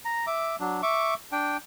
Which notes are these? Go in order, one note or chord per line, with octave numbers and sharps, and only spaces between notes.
A#5
E5 D6
F#3 D4
E5 C#6 D6
D4 G5